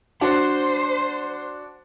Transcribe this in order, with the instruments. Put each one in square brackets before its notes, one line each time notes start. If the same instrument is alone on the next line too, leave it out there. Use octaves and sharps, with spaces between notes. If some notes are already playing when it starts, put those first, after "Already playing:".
[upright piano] D4 F#4 F#5 [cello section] C5